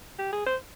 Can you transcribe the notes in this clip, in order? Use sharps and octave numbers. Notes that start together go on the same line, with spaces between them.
G4
G#4
C5